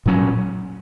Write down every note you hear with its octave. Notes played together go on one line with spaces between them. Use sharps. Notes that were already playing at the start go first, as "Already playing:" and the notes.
A#2 F#3 C#4